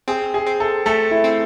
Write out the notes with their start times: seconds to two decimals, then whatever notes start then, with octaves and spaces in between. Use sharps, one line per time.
0.08 C4 G#4
0.34 G#4
0.47 C4
0.60 A4
0.86 A3 A4
1.11 E4
1.24 C4